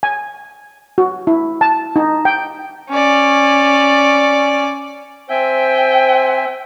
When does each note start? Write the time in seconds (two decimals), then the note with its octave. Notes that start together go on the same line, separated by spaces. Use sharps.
0.03 G#5
0.98 F#4
1.27 E4
1.61 A5
1.96 D#4
2.25 G5
2.90 C#4 D5
5.30 C4 C5 E5 G5 G#5